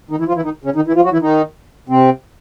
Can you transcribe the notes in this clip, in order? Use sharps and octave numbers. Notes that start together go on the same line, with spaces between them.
D#3 D#4
E3 E4
F3 F4
E3 E4
D#3 D#4
C#3 C#4
D#3 D#4
E3 E4
F3 F4
F#3 F#4
E3 E4
D#3 D#4
C3 C4